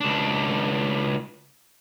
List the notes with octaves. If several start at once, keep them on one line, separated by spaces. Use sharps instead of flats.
C#2 D4